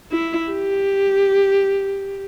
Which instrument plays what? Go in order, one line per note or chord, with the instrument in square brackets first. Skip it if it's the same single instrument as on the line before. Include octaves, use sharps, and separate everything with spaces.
[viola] E4
G4